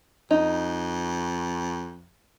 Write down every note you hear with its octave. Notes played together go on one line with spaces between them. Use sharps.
F2 D#4